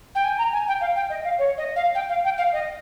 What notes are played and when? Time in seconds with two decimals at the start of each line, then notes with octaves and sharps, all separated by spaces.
0.15 G5
0.24 G#5
0.38 A#5
0.53 G#5
0.68 G5
0.81 F5
0.96 G5
1.10 D#5
1.24 F5
1.39 C#5
1.58 D#5
1.76 F5
1.95 G5
2.09 F5
2.24 G5
2.38 F5
2.53 D#5